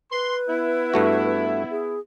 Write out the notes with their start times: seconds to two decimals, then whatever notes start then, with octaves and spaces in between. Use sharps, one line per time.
0.12 B4 C6
0.49 B3 E4
0.94 G2 A3 F#4
1.71 G#4